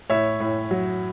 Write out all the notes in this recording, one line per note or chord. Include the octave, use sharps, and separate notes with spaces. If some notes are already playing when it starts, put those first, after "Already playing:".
A2 C#5 E5
A2
F#3